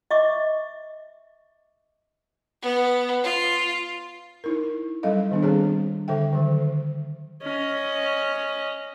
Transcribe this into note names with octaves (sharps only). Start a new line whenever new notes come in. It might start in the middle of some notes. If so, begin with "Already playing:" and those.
D#5 E5 C#6 D6
B3
F4
D#4 E4 A#4
F#3 G3 C#4 A4 D#5 F5
D#3 B3 D4
G3 C4 G#4 C#5
D3 A4 E5 G5
D3 D#3 F#3
C#4 D#5